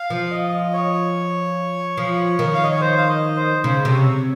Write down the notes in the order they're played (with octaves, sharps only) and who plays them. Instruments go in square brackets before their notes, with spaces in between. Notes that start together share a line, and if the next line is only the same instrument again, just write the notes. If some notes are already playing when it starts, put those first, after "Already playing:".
Already playing: [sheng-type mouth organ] F5
[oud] F3
[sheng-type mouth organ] D#5
C#5
[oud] F3
D#3
[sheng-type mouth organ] F5
D#5
C#5
C5
F5
D#5
C5
[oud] C#3 [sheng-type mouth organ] C5
[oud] C3
[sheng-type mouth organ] C#5